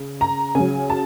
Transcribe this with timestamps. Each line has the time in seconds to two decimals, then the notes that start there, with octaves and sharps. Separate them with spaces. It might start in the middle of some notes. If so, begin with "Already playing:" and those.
Already playing: C#3
0.21 A#5
0.55 C#3 F#3 G#5
0.90 A5